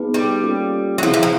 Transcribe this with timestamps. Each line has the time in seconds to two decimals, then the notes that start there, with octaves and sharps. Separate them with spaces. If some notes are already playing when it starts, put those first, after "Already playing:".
Already playing: B3 D#4 G#4 B4
0.14 G3
0.43 A#3 C#4 F4 A4
0.98 F#3
1.03 F3 C4 E4 G#4
1.14 E3
1.23 F3